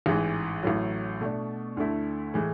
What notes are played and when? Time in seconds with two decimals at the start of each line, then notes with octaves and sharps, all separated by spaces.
0.06 A1 G#2 E3
0.63 A1 A2 F#3
1.20 B2 A3 D4
1.77 D2 D3 A3 E4
2.34 A2 E3 G#3